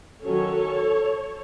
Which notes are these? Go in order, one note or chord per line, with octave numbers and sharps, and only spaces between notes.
D#3 F#3 C#4 A4 C#5